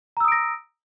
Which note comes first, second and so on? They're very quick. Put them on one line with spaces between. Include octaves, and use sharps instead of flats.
A#5 E6 D#6 D7 A#6